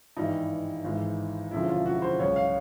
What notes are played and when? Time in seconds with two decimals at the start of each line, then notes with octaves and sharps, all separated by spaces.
0.17 G#1 G2 E3 G3 D#4
0.84 G#1 G#2 E3
1.51 E1 D2 C#3 F3 E4
1.69 F4
1.86 F#4
2.02 C5
2.19 C#2 C#3 F#3 C#5
2.36 F5